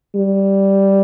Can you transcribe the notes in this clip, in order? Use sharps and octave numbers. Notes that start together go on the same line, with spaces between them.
G3